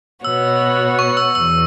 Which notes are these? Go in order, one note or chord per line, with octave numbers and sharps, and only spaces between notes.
B2 B3 F#4 C#5 E6
C#6
E6
E2 E6